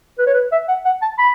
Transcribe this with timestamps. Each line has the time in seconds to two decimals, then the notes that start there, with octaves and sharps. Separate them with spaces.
0.18 B4
0.26 C#5
0.34 B4
0.52 E5
0.68 F#5
0.85 F#5
1.02 A5
1.18 B5